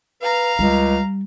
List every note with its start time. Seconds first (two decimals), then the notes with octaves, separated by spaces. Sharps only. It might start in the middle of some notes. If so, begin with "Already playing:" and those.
0.22 B4 F5 A#5
0.59 C#2 G3